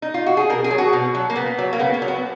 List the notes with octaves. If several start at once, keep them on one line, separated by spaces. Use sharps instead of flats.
D#4
F4
F#4
G#4
B2 A#4
G#4
F#3
F#4
B2
F#3
A#3
C#3 B3
F#3
A#3
C#3 B3
A#3
F#3
B3